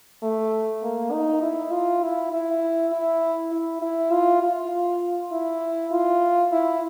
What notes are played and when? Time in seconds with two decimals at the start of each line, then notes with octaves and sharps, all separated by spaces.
0.23 A3
0.83 A#3
1.12 D#4
1.42 E4
1.72 F4
2.02 E4
2.33 E4
2.93 E4
3.52 E4
3.82 E4
4.12 F4
4.42 F4
5.32 E4
5.92 F4
6.52 E4